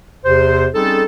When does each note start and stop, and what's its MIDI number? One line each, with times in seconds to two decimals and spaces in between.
0.25 0.67 40
0.25 0.67 48
0.25 0.67 72
0.74 1.03 55
0.74 1.03 60
0.74 1.03 61
0.74 1.03 63
0.74 1.03 68
0.74 1.03 69